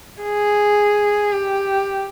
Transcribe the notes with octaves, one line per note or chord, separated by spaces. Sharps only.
G#4
G4